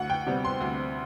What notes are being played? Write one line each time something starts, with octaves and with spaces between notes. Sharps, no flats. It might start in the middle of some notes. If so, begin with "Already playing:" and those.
Already playing: D2 F#5
G5
C3 G3 B3
C6
D2